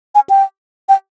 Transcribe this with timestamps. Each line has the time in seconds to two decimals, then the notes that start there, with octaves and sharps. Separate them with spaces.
0.15 G#5
0.30 G5
0.89 G5